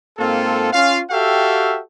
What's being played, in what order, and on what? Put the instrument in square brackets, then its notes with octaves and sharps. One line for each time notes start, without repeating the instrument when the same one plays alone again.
[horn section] G#2 A#3 C4 F4 A4
C#4 F4 F5
F#4 G4 A4 E5 F5 G5